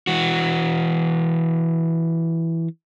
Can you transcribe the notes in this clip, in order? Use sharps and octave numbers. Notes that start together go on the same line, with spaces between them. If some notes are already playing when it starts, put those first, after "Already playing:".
E3 F#4